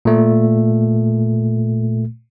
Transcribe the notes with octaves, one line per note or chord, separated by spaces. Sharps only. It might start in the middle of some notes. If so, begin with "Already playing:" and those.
A#2 A3